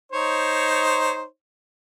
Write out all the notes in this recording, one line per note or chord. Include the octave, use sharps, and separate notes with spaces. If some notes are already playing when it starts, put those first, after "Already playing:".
D#4 C5 C#5